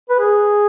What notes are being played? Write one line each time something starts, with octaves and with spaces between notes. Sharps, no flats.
B4
G#4